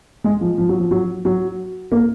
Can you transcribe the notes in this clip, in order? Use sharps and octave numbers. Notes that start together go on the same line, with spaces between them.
G#3
F3
F3
F#3
F3
F#3
F#3
A#3